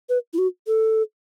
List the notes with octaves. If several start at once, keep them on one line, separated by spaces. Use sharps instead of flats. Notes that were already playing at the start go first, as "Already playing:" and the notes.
B4
E4
F#4
A4